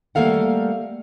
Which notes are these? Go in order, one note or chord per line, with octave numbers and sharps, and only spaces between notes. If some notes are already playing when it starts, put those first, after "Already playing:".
G3 A3 A#3 A4 F5 F#5